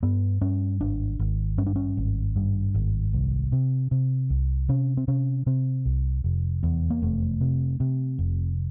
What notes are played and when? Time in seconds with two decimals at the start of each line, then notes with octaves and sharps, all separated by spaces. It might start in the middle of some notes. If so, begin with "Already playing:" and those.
0.03 G2 B3
0.41 G2 C#4
0.81 G#1 D4
1.19 G#1
1.58 G2 C#4
1.66 D4
1.76 C#4
1.97 G#1
2.36 G2
2.75 G#1
3.13 C2
3.52 C3
3.91 C3
4.30 C2
4.69 C3 C#4
4.97 C4
5.08 C3 C#4
5.46 C3 C4
5.85 C2
6.24 F1
6.63 E2
6.90 A#3
7.02 F1 A3
7.41 C3
7.80 C3
8.19 F1